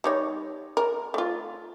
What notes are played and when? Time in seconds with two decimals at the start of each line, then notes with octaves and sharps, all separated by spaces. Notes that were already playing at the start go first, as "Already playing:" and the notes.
0.04 G3 D#4 C#5
0.77 A#4
1.14 A3 F4